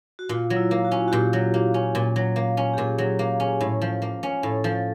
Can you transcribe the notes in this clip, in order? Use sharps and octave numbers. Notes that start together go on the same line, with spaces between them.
F#4
A#2 F4
F#3
E4
A#3
F#4
C#4
F#4
A#2 G4
F#3
A#3
C#4
A#2
F#3
A#3
C#4
G4
A#2 G#4
F#3
A#3
C#4
A2
F3
A#3
C#4
A2 A4
F3 A4